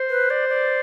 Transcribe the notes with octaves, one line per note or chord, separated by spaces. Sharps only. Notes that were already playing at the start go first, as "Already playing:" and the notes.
Already playing: C5
B4
D5
D5